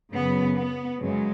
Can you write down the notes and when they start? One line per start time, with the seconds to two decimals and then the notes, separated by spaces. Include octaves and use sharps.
0.12 F#2 C#3 F#3 B3
0.58 B3
1.03 F#2 C#3 F#3 G#3